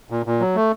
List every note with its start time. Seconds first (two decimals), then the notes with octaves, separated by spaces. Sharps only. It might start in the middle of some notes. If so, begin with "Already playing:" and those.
0.10 A#2
0.26 A#2
0.40 F#3
0.56 A3